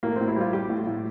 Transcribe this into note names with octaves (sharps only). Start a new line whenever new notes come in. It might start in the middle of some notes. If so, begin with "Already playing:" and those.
A2 A#3
C4
A2
E4
G3 F4
G3 G4
A2
A2